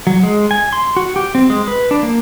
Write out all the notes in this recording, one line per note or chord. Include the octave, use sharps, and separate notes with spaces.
F#3
G#3
G#5
C6
F#4
G4
C4
G#3
B4
D4
A#3